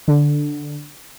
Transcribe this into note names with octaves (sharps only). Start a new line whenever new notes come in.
D3